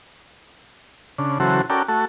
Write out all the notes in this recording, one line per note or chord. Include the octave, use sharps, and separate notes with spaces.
C#3 D4
C#3 E3 F#3 F#4 A4 C5
C#4 F#4 A4 A#4 D5 G5
A3 F#4 A4